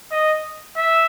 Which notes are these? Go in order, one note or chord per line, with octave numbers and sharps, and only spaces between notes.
D#5
E5